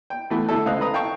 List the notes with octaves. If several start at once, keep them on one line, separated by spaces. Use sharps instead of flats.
G5
E3 A3 B3
D3 A3 E4 A4
C#2 C4 D#5 F5 D#6 F#6
B4 A#5 D#6
F5 G5 A5 C#6